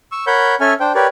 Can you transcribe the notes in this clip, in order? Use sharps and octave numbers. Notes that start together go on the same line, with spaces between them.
C#6 E6
A#4 C#5 F#5 B5 G6
C#4 A4 C#5 E5 G#5 F6
D4 C5 G5
G4 A#4 B4 C#5 D5